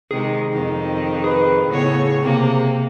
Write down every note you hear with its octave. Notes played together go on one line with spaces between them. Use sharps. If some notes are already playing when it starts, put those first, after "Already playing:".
C3 D#3 G#3 G#4
F2 D#3
G#4 B4
A2 C#3 B3 C#5
C3 A#3